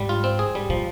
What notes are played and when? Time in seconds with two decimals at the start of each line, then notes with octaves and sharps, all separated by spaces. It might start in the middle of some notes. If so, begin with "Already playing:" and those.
Already playing: G#2 G3
0.09 F4
0.24 C4
0.39 G#4
0.55 G3
0.69 A#2 F3